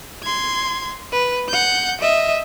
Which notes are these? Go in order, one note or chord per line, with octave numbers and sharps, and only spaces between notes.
C6 G#6
B4
F#5 G6
D#5 E5